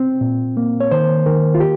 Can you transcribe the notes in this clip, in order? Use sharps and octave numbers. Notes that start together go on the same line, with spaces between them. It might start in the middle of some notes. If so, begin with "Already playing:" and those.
Already playing: C4
A#2
A#3
C#5
D#3 C5
D#3 A#4
F4
G4